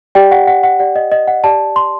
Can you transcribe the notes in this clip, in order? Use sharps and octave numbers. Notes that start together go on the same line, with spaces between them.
G4 D5 G5
F#5
F#5
F#5
G4 D5 F#5
D#5
D#5
F#5
G4 D5 A5
C6